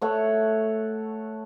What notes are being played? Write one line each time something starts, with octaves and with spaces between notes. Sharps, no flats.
A3 A4 C#5 F#5